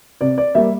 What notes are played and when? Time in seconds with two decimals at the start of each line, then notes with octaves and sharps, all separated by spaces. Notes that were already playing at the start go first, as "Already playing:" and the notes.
0.21 C3 D5
0.38 D5
0.55 G3 A#3 E5